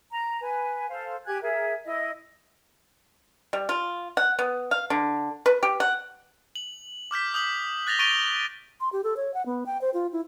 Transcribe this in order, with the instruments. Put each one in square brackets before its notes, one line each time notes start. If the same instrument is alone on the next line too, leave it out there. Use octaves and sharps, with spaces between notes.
[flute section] A#5
B4 G#5
A4 C5 F5
G4 G#5 F#6 G#6
G#4 A#4 E5
E4 D#5
[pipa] G3
F4
F#5
B3
F5
D3
B4
G4
F#5
[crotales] F#7
D6 F6 G6 B6
D#6 G6 F#7
F#6 A6 A#6 F7 G7
C#6 A6 D7 D#7 F7 G7
[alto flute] C6
G4
A4
C#5
F#5
B3
G5
C5
F4
E4